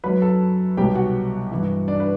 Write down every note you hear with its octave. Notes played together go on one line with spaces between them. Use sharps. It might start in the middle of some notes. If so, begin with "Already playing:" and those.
F#2 F#3 B4 B5
A4 A5
C2 B2 F#3 G4 G5
F#4 F#5
G2 E3
D4 D5
B4